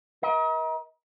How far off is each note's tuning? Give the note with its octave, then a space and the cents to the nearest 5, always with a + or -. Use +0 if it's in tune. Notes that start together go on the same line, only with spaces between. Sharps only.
A#4 +35 D#5 +40